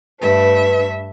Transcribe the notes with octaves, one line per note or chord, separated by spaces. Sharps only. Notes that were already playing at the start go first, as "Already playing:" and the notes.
G2 A3 B4 E5